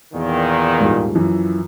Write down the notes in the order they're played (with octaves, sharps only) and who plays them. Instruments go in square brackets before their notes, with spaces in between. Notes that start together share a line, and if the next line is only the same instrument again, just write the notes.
[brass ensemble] E2 A#2 D#3
[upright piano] D#1 G#2 F3
F#2 E3 F3